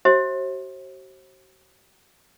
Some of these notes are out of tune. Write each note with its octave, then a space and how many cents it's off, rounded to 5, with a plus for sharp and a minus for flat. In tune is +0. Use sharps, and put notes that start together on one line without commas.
F#4 +40 C5 +40 E5 -25